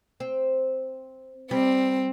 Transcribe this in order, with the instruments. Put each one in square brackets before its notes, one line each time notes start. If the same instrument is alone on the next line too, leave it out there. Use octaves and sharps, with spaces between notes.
[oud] C4
[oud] G3 [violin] C4